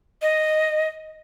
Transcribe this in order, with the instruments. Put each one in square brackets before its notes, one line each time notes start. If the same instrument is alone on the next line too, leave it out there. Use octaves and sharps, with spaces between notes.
[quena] D#5